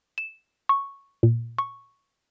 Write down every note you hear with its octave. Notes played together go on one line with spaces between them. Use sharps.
E7
C#6
A#2
C#6